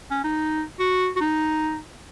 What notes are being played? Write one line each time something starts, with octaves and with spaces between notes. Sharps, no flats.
C#4
D#4
F#4
F#4
D#4